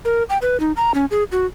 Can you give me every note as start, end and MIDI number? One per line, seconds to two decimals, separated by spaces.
0.05 0.23 70
0.30 0.38 79
0.42 0.60 71
0.60 0.72 63
0.77 0.94 82
0.94 1.05 61
1.11 1.24 68
1.32 1.46 66